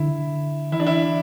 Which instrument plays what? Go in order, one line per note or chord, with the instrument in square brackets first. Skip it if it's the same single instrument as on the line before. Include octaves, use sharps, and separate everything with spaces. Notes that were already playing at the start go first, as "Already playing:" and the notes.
Already playing: [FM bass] D3 [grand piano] E4
[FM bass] E3 [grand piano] E4
[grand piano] D4
E4